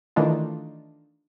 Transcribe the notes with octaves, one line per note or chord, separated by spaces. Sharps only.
D#3 E3 A3 D4 D#4 F4